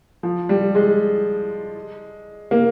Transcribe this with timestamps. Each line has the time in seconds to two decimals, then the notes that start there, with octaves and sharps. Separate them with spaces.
0.23 F3
0.49 G3
0.75 G#3
2.51 A#3